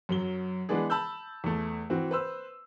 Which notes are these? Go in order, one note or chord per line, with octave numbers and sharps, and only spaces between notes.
F#2 F#3 G7
E3 G#3 B3 D4 G#4
A5 B5 E6 G6
E2 A3
E3 C4 F#4
B4 C5 E6